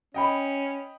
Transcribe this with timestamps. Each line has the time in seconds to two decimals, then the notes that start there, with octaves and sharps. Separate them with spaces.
0.14 C#4 D#5 G5 B5